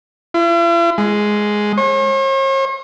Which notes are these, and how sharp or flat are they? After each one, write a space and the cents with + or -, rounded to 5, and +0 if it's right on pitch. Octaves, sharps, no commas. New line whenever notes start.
E4 +45
G#3 +5
C#5 -45